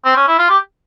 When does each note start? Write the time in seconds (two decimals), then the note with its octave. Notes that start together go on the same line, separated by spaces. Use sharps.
0.05 C4
0.16 C#4
0.27 E4
0.38 F4
0.50 G4